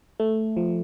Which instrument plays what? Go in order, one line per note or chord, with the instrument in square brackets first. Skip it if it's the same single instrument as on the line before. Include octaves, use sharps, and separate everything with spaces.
[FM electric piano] A3
F3